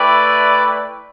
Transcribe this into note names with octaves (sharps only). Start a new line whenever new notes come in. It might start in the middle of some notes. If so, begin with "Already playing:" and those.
Already playing: A3 E4 B4 D5 G5